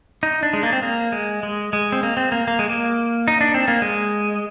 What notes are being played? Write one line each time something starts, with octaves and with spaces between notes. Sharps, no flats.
D#4
D4
G#3
A#3
C4
A#3
G#3
G#3
G#3
C4
A#3
C4
A#3
A#3
G#3
A#3
D#4
D4
C4
A#3
G#3